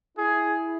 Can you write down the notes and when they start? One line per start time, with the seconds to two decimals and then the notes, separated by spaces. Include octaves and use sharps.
0.18 E4 G#4